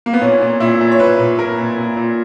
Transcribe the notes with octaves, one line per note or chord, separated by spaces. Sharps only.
A#3
B3
A#2 C#4
A#2
A#2 E4
A#2
C#5
A#2 B4
A#2
A#2 A#4
A#2
A#2
A#2